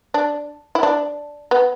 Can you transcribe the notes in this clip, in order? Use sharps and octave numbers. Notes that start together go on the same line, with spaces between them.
D4
E4
D4
B3